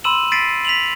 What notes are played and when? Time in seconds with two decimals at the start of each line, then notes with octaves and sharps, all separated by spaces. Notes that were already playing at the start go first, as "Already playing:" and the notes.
0.04 B5 C6 E6 D#7 E7 F#7
0.32 A6 B6 C7 D7 D#7
0.65 B6 F7 F#7